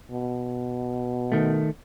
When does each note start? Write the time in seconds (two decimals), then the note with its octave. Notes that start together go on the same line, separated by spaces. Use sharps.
0.11 B2
1.32 D#3 A3